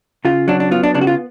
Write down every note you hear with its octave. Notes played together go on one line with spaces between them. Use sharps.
C#3 F4
F#3 D4
D4
B3 F4
D4
C#3 D4
F#4
F4